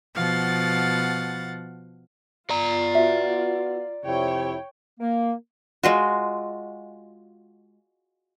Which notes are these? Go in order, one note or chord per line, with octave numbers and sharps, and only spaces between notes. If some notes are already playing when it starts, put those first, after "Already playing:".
B2 F3 F5 F#5 A6
F4 D5 A#5
B3 F#4 E5
F2 C3 E4 C#5 G5
A#3
G#3 F4 F#4